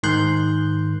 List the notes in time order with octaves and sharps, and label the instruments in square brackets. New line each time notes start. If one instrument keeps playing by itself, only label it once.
[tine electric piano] G#2 D#3 C6 F#6 G6